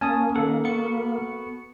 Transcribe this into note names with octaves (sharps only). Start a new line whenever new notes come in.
A#3 C#4 G#5 A5 D#6
D#3 A4 F#5
B3 F#4 C#7